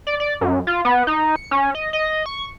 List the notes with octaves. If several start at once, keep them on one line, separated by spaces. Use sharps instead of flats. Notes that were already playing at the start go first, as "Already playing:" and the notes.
D5
D5
F#2
F4
B3
D#4
C#7
C#4
D#5
D#5
C#6